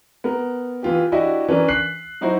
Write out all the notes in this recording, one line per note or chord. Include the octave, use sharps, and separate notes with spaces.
B3 A#4
E3 F4 G4
D4 E4 F#4 G4 D#5 E5
E3 C#4 D4 A#4
F#6 B6 C7 F#7
F#3 D#4 E4 F#4 C5